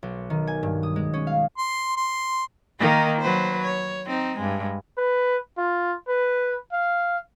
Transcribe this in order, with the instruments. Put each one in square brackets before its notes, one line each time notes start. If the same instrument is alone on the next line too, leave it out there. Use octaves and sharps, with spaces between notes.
[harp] B1
D#3
G#5
G2
D#6
G#3
C#4
F5
[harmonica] C6
C6
[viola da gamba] D#3 A#3 D#4
F#3 B4 C5
C#5
C4 D#4
G2 G#3
[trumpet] B4
F4
B4
F5